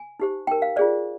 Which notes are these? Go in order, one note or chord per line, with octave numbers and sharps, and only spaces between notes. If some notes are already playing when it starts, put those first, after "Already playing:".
Already playing: G#5
D#4 G4 C5
D#4 A#4 G5
F5
F4 G#4 C5 D5